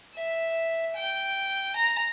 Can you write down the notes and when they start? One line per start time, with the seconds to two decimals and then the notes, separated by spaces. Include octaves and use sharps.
0.15 E5
0.96 G5
1.76 A#5